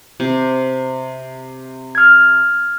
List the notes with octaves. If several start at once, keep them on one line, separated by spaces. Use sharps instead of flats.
C3
F6 G#6